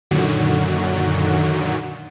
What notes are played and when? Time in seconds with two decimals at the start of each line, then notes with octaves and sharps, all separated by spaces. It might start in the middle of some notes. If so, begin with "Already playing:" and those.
0.11 F#2 A#2 D3 D#3 F#3 F#4